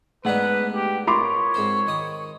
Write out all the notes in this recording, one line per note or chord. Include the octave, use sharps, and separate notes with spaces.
G#2 A3 B3 D4 D#4 B4 F#5
G4
F4 A#4 C#5 B5 C6 D6
G#2 C4 C5
D#3 D#6